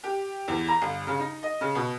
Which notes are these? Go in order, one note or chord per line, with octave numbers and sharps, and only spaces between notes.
G4
E2
A#5
G1
C#3
D#4
D#5
C#3
B2